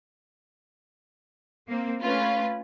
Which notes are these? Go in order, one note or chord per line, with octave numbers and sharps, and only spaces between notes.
A#3 C4
A3 C#4 F4 B4